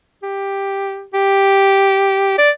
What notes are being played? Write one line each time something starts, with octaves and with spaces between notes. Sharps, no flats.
G4
G4
D5